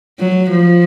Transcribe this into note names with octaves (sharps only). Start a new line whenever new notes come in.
F#3
F3